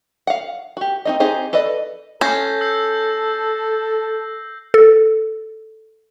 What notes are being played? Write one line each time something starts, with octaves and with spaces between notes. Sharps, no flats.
F5 F#5
F#4 G4
C4 D#4 D#5
C4 D#4 G4 G#4 C5
A4 B4 D5 D#5
C#4 A4 G6 A#6 C7
E6 G6 C7
A4